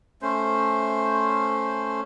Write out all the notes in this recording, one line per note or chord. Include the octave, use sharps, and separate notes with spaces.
A3 C#4 C5